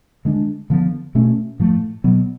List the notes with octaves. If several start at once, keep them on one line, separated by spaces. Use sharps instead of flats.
D3 G#3 D4
D3 F3 B3
B2 A3 C#4
A2 F3 A3
B2 F#3 B3